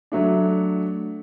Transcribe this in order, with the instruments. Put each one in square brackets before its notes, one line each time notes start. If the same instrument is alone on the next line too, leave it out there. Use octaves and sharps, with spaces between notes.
[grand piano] F#3 A3 D4